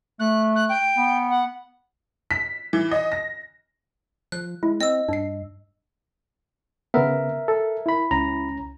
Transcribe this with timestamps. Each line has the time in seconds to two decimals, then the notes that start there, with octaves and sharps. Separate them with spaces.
0.20 A3 F#6
0.56 F#6
0.69 G5
0.97 B3
1.30 F#5
2.31 B6
2.73 E3
2.91 D#5
3.12 A#6
4.32 F3 F#6
4.63 G#3 E4
4.81 C4 D#5 E6
5.09 G2 D4 C7
6.94 C#3 B3 A#4 E5
7.48 A4
7.86 E4 B5
8.11 C#2 C#4 A#5